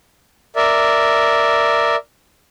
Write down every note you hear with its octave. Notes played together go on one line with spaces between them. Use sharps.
A#4 D5 E5